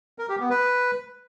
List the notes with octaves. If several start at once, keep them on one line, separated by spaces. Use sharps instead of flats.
A#4
G4
B3
B4